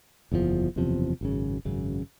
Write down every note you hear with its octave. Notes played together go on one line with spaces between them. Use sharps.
F#1 E2 C3 F3
F#1 E2 C3 F3
G#1 F#2 C#3
G#1 F#2 C#3